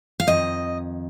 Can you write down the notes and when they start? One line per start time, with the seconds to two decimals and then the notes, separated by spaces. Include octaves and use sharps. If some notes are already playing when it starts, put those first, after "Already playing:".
0.20 F5
0.27 F2 D#3 D#5